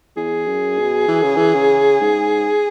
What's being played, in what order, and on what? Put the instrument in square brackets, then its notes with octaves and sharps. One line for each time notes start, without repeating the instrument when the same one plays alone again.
[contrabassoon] E2 [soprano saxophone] G#4
[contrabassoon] F#2
B2
E3
C#3
E3
C#3
G#2